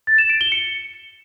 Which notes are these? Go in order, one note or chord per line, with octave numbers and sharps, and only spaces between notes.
A6
E7
D7
G7
C#7